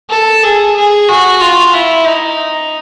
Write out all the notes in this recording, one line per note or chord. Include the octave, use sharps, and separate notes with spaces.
A4
G#4
G#4
F#4
F4
E4
D#4